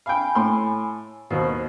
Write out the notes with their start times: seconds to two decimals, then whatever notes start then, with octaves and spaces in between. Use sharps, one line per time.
0.06 F5 G5 G#5 B5
0.35 A2 C6
1.31 D#2 B2 C5